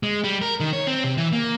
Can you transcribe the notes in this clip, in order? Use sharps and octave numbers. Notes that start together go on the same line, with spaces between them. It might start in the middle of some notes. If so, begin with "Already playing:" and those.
G#3
G3
A#4
D#3
C#5
C4
C3
E3
A#3